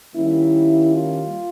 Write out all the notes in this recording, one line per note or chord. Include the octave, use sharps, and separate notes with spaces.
D#3 G3 A#3 C#4 E4
F4